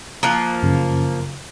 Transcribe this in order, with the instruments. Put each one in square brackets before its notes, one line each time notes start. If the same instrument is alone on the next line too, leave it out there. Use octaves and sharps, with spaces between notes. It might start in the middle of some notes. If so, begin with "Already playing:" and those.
[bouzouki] F3 A#3 [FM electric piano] D#6 F#6
[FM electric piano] F#2 C#3